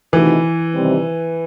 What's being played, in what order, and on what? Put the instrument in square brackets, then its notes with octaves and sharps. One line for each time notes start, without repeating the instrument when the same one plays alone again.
[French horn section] C3 D#3 A3 D#4 F#4 [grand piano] E3
[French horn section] C3 D#3 G3 C4